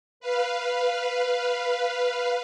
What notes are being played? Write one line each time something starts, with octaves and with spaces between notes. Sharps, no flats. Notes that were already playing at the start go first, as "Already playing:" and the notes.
B4 F5